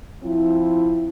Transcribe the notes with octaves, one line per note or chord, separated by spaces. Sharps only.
F3 C4 E4